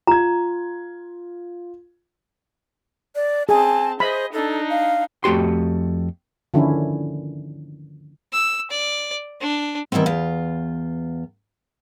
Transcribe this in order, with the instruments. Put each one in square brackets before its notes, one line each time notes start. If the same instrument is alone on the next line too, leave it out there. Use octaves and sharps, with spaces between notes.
[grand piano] F4 G#6 [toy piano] A#5
[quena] D5
[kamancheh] C4 A5 [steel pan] G#4 [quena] G#5
[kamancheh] G#4 D#5 [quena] C5 [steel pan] B5
[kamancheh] D4 D#4 [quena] A4
[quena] F5
[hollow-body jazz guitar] F2 A3 F#4 G4 C6
[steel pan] D3 D#3 F3 C#4 D4 E4
[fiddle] E6
D5
D4
[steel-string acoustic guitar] D#3 E3 G3 B3 C4
E2 F4